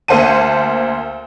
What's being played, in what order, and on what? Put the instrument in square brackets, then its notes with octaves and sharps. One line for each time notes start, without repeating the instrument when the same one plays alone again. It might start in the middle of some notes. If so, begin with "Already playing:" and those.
[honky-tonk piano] D2 A#3 C5 F#5 A5 D#7